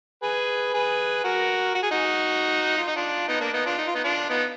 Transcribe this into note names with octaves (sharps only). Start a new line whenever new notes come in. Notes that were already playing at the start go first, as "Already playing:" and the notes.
G#4 B4
G#4 B4
F#4 A#4
F#4
G#4
D#4 F#4
F4
D#4
D4 F4
B3 D#4
A#3 D4
B3 D#4
D4 F4
D#4
F4
B3 D#4
D4 F4
B3 D#4